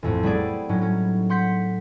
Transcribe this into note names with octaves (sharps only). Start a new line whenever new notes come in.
A1 F2 A2
G3 A3 B3 E4 G#4 D5
A2 F#3 C#4 D#4
C#4
F#5 C6 G6 B6 C#7